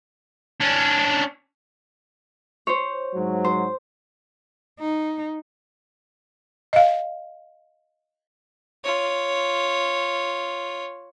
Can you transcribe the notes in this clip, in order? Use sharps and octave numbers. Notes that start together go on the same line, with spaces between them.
C#4 D4
C5 C#5
G#2 F#3
C5
D#4
D#5 F5
F4 C#5